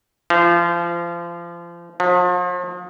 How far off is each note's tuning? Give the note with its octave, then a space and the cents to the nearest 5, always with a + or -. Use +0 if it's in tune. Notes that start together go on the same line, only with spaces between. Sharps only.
F3 -30
F3 +40